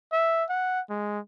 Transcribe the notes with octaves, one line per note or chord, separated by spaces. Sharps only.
E5
F#5
G#3